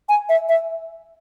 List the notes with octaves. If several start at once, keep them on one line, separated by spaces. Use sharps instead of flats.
G#5
E5
E5